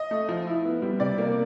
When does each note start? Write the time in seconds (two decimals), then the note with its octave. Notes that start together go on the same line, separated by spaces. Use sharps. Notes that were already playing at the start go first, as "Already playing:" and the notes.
Already playing: D#5
0.11 A3
0.29 F3
0.47 E4
0.65 B3
0.82 G3
1.00 C3 D5
1.18 A#3